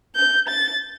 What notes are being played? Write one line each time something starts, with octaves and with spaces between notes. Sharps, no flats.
G6
A6